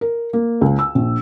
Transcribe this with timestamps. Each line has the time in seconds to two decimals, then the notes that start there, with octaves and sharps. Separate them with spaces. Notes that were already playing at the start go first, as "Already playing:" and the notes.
0.01 A#4
0.33 A#3
0.61 C#2
0.79 E6
0.95 A#1